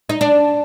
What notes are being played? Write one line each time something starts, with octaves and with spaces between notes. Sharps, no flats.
D#4
D4